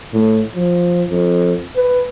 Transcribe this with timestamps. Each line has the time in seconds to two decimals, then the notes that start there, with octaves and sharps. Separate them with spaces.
0.13 A2
0.55 F3
1.10 F2
1.76 B4